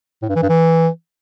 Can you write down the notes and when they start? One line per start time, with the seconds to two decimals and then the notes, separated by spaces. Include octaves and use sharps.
0.22 A2
0.29 G2
0.36 E3
0.42 G2
0.49 E3